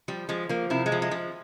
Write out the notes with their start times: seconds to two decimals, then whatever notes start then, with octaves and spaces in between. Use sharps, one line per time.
0.08 F3 G3
0.29 F3 G#3
0.49 F3 A#3
0.70 C3 E4
0.86 G#3
0.92 F3
1.02 G#3
1.11 F3